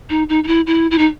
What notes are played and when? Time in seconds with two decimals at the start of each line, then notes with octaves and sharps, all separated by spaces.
0.10 D#4
0.29 D#4
0.44 D#4
0.48 E4
0.67 E4
0.91 E4
0.98 D#4